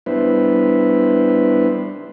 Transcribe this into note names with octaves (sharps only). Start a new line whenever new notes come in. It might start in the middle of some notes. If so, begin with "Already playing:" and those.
G3 B3 D4 E4 B4 C5